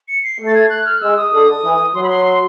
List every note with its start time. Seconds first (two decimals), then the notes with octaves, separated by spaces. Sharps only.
0.08 C#7
0.24 C7
0.39 A3
0.47 A6
0.55 G#6
0.70 F#6
0.86 F6
1.01 G#3 E6
1.17 D#6
1.32 D3
1.63 E3
1.94 F#3 C6
2.03 B5
2.09 C6
2.25 C6